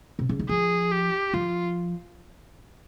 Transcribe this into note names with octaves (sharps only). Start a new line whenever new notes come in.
C3
C#3
D#3
F3 G#4
G4
F3 F4